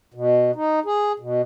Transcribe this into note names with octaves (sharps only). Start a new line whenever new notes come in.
B2
D#4
G#4
B2